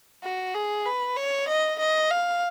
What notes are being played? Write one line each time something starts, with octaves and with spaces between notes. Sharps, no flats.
F#4
G#4
B4
C#5
D#5
D#5
F5